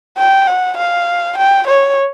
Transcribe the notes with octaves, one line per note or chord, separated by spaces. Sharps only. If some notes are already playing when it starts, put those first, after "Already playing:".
G5
F#5
F5
G5
C#5